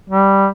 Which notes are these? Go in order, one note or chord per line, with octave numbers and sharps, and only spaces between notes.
G3